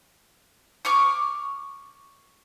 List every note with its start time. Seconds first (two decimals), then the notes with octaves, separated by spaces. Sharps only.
0.85 C#6 D6 F6